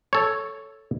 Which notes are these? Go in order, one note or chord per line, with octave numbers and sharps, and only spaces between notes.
A4 C#5